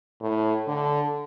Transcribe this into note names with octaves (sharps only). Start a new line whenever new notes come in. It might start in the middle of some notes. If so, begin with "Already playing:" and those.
A2
D3